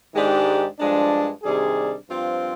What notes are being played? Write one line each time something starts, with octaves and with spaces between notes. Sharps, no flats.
G#2 D#3 G#3 D4 G4
G2 F3 G#3 D4
C3 D#3 G3 D4 G#4
G2 F3 C4 F4